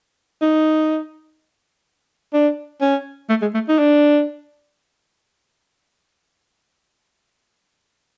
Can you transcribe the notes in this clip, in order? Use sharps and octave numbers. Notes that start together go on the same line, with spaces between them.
D#4
D4
C#4
A3
G#3
A3
D#4
D4